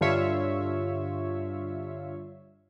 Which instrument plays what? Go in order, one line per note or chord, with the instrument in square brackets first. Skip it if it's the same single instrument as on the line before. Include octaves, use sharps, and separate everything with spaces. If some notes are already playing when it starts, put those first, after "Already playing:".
[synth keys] G2 D3 F4 C#5 E5